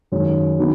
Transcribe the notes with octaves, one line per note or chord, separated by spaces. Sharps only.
F#2 D#3 G#3 C#4
D#3 F#3 B3 D#4